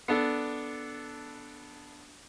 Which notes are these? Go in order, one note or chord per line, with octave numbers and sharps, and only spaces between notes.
B3 D4 A4